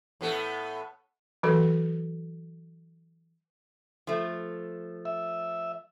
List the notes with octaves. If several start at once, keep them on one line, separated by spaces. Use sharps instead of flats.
A2 B3 A4
E3 F#3 F#4 A4 B4
F3 A3
E5